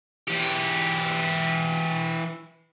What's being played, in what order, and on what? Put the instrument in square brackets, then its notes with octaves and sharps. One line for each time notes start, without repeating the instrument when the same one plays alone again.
[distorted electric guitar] E3 G4